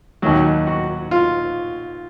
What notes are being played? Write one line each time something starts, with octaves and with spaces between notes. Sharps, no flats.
D#2 D#3 F#3 F#4
F#4
F4